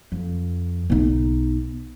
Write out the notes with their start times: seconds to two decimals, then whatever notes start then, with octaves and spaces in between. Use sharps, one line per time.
0.12 F2
0.90 B1 D#4